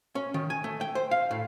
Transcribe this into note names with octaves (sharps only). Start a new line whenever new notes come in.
C#4
D#3
G#5
A3
G5
C5
F5
A2